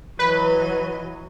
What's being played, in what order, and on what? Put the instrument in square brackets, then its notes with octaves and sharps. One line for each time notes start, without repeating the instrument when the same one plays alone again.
[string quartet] E3 F#3 D#5 [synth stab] B4